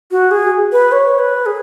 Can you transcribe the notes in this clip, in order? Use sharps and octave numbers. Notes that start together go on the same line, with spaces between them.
F#4
G#4
B4
C#5
B4
G#4